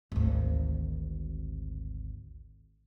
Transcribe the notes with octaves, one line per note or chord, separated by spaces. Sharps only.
G#1 D2